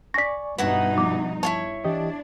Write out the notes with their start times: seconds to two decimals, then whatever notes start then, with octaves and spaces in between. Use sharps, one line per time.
0.14 D5 G#5 C#6 A#6 B6
0.58 G2 B2 D#4 E4 F#4 B4 F#5
0.98 F3 D6
1.43 E4 F4 C#5 A5
1.84 E3 D4 G4 D#5